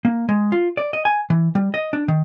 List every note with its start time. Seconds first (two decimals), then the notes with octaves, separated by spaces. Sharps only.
0.05 A#3
0.29 G#3
0.52 F4
0.77 D5
0.93 D#5
1.05 G#5
1.30 E3
1.55 G3
1.74 D#5
1.93 D4
2.08 D#3